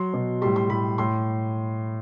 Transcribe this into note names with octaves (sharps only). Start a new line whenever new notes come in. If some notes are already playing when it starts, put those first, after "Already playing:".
Already playing: F#3 C6
B2 F#3
A2 G3 C6
C6
A2 G3 B5
A2 C6